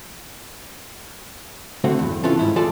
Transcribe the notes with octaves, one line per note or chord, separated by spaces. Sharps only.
D3 A3 C4 F#4
E2 G2
C3 E3 C#4 F4 A4
G#2 E4
E3 F4 G#4 A4 D5 A5